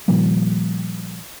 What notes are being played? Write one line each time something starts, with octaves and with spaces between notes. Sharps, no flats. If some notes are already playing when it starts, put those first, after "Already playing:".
A#2 D#3 F3 G3